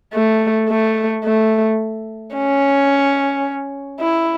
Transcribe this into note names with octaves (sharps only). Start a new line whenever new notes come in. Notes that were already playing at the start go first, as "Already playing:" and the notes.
A3
A3
A3
C#4
E4